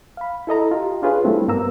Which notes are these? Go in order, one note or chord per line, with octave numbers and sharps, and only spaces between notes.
F5 B5
E4 A4 D#5 A#5
F4 G4
D4 F4 G#4 B4 C#5 F5
G3 A3 C4 E4
G2 G3 A#3 B3 A#5 E6